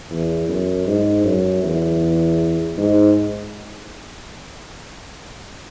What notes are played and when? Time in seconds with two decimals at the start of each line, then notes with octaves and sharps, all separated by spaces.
0.11 E2
0.49 F#2
0.87 G#2
1.25 F#2
1.63 E2
2.77 G#2